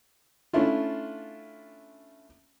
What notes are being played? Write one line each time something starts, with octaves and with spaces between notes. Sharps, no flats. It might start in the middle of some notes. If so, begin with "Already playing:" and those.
A3 C#4 D4 E4 F4